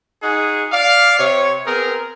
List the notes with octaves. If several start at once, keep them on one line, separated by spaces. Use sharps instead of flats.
D#4 F#4 G#4
D5 F5
C3 C#5
B3 C4 G#4 A#4